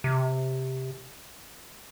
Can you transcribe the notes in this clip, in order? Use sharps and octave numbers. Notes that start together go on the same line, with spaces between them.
C3